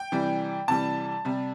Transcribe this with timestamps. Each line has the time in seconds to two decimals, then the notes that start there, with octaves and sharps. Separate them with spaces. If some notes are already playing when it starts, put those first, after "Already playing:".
Already playing: G5
0.12 C3 E3 G3
0.68 C3 E3 G3 A5
1.25 C3 G3